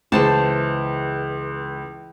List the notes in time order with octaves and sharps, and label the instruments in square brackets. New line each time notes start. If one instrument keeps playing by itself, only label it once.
[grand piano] C#2 [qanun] E3 C5 A5